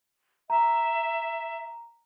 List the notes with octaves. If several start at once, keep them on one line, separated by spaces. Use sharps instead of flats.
E5 A#5